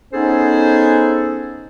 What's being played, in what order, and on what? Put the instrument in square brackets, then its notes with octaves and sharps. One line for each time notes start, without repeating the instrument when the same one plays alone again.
[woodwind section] B3 C#4 D#4 G#4 A4 C5